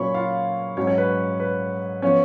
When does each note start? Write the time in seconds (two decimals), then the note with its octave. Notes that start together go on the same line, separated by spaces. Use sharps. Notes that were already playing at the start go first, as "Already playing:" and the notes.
Already playing: A#2 F#3 C#4 C#5 B5 C#6
0.14 F4 F5
0.77 G#2 F#3 C#4 C#5
0.87 C#4 C#5
0.98 B4
1.40 B4
2.02 F3 B3 C#4 C#5